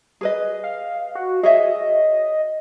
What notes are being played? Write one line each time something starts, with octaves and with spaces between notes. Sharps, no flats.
G#4 B4 D#5
F5
F#4
G#4 C#5 D#5 E5